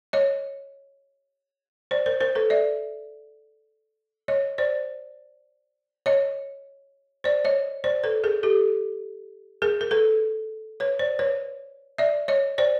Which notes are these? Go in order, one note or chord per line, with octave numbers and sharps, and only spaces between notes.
C#5 D#5
C5 D5
A#4 C5
A#4 C5
A4 B4
D5 E5
C#5 D#5
C5 D5
C#5 D#5
C5 D5
C#5 D#5
C5 D5
A4 B4
G#4 A#4
G4 A4
G#4 A#4
A#4
A4 B4
B4 C#5
C5 D5
B4 C#5
D5 E5
C#5 D#5
C5 D5